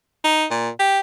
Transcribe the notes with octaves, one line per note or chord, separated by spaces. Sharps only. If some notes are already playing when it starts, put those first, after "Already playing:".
D#4
A#2
G4